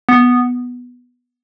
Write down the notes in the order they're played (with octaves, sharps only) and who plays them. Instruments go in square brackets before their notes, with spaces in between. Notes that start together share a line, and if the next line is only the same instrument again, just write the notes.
[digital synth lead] B3